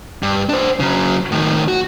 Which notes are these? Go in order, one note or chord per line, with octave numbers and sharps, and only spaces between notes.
G2
D4 C5
C#3 F#3
A2 D#3
F#4